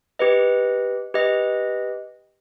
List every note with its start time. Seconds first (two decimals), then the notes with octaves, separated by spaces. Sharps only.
0.19 G4 B4 D#5
1.14 G4 B4 D#5